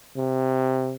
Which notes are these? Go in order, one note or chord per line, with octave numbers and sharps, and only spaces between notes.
C3